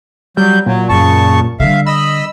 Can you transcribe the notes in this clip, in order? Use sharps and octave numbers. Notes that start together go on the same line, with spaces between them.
F#3 G3 G6
A#2 F#3
F#2 C#3 A5 C#6
D3 G3 E5 F5
D#5 B5 E6